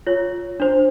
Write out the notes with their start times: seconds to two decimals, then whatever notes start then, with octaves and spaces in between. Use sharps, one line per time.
0.07 F4 C#5
0.60 D4 C5